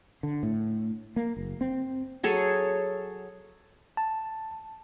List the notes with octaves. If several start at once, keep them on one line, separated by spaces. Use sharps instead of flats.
D3
A2
A#3
F#1
C4
F#3 G#4 A4 C#5
A5